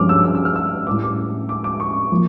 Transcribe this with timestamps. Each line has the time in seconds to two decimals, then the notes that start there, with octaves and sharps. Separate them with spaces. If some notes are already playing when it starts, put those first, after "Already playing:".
Already playing: G2 F3 C#4 D6 F6
0.09 E6
0.24 E6
0.35 E6
0.45 F6
0.56 E6
0.87 A2 G3 C#4 D6
1.02 D6
1.49 D6
1.64 D6
1.80 C#6
2.11 F3 A#3